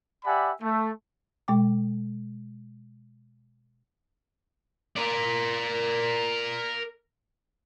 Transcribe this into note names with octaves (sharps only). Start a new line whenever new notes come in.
G4 D5 E5 F#5 G#5 B5
A3
B2 G#3 G5 D6
A#4 D5